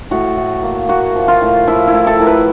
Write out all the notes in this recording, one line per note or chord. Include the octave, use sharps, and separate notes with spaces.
A2 F#4
A2
A#3
A#3 F#4
F3
F4
A2
F3 E4
E4
A2
A4
A2 A#4
B4